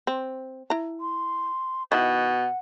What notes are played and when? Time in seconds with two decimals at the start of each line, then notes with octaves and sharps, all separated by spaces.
0.07 C4
0.70 E4 A#5
1.01 C6
1.92 B2 D#3 E4 F#5